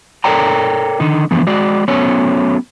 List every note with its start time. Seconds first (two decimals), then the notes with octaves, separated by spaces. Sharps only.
0.24 A4 A#4 C#5 D5 G5 A#5
1.00 D3 D#3 D#4
1.31 D3 E3 F3 A3 B3
1.47 G#3 F#4 D5
1.88 F#3 A3 B3 C#4 C#5